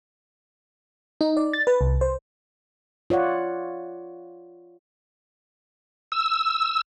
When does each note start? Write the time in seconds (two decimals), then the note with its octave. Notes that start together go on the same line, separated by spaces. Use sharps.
1.21 D#4
1.37 D5
1.53 A6
1.67 B4
1.81 C2
2.01 C5
3.10 F4 C#5 D5 F#5
6.12 E6